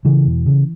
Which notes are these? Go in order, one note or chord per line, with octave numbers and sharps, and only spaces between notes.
C#3 E3
E1
C#3